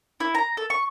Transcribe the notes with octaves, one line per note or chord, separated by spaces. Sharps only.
E4
A#5
A4
C#6